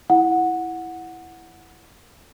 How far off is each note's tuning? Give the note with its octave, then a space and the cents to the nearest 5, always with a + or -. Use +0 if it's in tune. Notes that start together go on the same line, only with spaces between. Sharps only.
E4 +0 F#5 -10